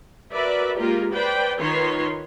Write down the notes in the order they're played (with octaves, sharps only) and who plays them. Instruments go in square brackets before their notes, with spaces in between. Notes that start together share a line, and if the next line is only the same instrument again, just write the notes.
[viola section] F#4 A#4 B4 D5 E5
G#3 A#3 F4 G4 A#4
B4 C5 D5 G5
D#3 F4 B4 C#5 C6